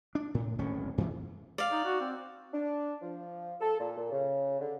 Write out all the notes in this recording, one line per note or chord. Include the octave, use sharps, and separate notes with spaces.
D4
A2
D1 G#1 A2 C#4
G2 E3
D5 F5
D#4
F#4
C4
D4
F3
A4
A#2
A#2
C#3
D3